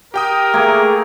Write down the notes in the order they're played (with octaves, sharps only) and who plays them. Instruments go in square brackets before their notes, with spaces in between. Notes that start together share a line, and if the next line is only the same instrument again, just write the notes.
[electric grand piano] G4 G5 D#6 [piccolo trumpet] A#4
[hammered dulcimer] A3 A#3 C#5 [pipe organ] G#4